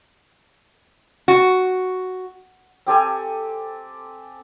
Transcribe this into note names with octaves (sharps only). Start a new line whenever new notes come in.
F#4
C4 G4 A4 G#5